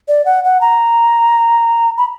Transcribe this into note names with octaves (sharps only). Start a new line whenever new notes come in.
D5
F#5
F#5
A#5
B5